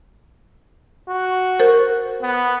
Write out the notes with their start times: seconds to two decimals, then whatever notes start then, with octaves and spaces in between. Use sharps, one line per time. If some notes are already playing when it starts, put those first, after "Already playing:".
1.09 F#4
1.59 A#4 C5
2.22 B3